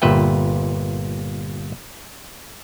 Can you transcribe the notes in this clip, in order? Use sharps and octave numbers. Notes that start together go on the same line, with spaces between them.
G1 A#2 B4 E5 G5